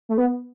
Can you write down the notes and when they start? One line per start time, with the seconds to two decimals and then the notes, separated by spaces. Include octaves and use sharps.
0.09 A3
0.18 B3